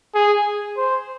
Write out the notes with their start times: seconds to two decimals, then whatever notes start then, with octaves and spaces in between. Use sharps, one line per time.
0.15 G#4
0.77 C5